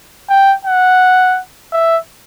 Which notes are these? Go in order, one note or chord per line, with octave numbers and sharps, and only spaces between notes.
G5
F#5
E5